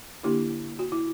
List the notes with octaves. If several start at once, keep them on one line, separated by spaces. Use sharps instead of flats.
D3 A#3 D4 E4 G4
F#4
E4